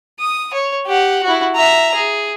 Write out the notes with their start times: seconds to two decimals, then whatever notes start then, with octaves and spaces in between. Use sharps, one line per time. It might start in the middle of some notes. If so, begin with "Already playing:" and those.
0.20 D#6
0.54 C#5
0.87 G4 F#5
1.24 E4 F#4
1.56 E5 A#5
1.95 G#4